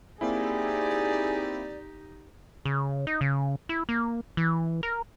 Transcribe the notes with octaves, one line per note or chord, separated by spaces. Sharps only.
A#3 C4 D#4 E4 G4 G#4 D5
C#3
D#4
C#3
E4
A#3
E3
A#4